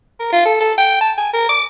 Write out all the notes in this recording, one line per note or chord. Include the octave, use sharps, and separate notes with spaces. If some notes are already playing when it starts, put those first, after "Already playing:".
A#4
F4
A4
A4
G5
A5
G#5
A#4
D6